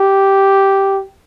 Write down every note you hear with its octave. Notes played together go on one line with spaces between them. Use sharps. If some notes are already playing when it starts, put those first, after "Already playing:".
Already playing: G4